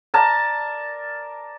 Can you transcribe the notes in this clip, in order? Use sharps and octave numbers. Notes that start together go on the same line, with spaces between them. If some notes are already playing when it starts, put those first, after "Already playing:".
A#4 D5 A5